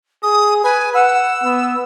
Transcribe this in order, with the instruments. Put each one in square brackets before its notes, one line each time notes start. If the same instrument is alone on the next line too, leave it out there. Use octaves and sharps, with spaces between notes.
[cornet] G#4 [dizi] D#6
[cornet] B4 [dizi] G#5
[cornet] F#5 [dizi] E6
[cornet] B3